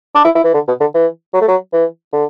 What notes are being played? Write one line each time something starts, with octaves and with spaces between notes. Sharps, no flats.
D4
E4
E4
E3
D3
B2
D3
E3
F#3
A3
F#3
E3
D3